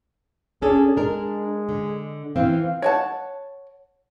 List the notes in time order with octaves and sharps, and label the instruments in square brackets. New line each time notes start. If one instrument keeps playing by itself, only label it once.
[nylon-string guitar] C#4 D4 A4 [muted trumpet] G#4
[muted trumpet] G#3 [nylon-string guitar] D4 A#4
[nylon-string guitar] D3
[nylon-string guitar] E3 C4 [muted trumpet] F5
[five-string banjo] C#5 F#5 A5